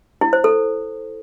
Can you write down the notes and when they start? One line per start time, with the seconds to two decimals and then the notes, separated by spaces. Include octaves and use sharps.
0.21 E4
0.33 C5
0.44 A4